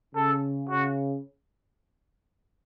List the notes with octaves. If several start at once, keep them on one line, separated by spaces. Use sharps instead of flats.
C#3 A4
C#3 F#4